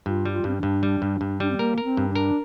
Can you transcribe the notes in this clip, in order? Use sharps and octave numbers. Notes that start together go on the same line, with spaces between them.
G2 F4
G3
F4
G2 C4
D4
G2
G3
G2
G2
G3 D4
C4
A#3 A#4
A#4
C4
G2
D4
A#4